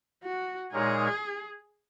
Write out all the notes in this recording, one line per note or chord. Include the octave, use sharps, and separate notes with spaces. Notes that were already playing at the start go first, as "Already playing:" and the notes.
F#4
A#2 G#3 D#4 G#4 A#4 C#5